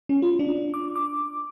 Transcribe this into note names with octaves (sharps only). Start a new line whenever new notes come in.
C#4
F4
D4
D6
D6